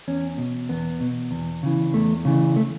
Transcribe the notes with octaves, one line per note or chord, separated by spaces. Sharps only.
E2 C#4
B2
E2 B3
B2
E2
C#3 E3
E2 A3
C#3 E3
A3